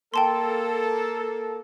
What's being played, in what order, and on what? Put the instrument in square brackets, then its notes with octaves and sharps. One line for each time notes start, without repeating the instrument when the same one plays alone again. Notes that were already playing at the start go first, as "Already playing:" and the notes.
[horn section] A#3 A4 [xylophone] G5 A5 C6